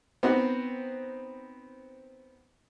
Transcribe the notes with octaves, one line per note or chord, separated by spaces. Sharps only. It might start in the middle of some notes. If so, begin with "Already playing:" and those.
B3 C4 D#4 F#4